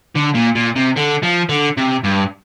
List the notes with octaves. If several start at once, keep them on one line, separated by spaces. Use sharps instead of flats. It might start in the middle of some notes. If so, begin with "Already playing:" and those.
D3
A#2
A#2
C3
D3
F3
D3
C3
G2